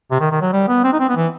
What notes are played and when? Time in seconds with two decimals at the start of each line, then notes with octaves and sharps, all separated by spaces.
0.11 C3
0.20 D#3
0.31 D#3
0.41 F#3
0.53 G3
0.68 B3
0.84 C4
0.92 D#4
0.99 C4
1.09 B3
1.16 E3